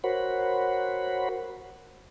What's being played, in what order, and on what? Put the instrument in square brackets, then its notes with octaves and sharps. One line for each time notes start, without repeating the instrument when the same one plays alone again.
[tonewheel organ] F#4 A#4 C5 C#5 F#5 B5